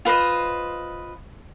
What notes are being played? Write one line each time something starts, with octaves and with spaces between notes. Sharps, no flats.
F4 B4 C5 D#5